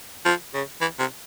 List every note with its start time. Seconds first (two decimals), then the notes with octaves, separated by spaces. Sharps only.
0.25 F3
0.54 C#3
0.81 E3
0.99 C3